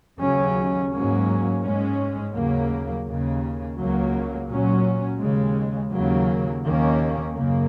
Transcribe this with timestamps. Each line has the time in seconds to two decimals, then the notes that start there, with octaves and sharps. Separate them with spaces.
0.19 D#2 C#3 F#3 C#4
0.91 G#2 F#3 A#3 C#4
1.63 G#2 G#3 C#4
2.34 D#2 C#3 F#3 A#3
3.05 D#2 C#3 A#3
3.77 C#2 C#3 F#3 A#3
4.48 A#2 F#3 C#4
5.20 D#2 C#3 G#3
5.92 D#2 C#3 F#3 A#3
6.63 D#2 D#3 A#3 C#4
7.34 F#2 C#3 A#3